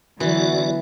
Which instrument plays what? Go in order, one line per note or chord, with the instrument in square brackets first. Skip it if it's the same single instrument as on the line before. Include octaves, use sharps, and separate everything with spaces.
[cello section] D3 F#3 B3 [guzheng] E3 [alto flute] E4 [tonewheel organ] F#4 D5